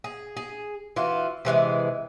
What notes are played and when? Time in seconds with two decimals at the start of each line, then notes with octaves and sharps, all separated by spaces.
0.04 G#4
0.37 G#4
0.96 E3 F4 F#4
1.45 C3 E3 G3 G#3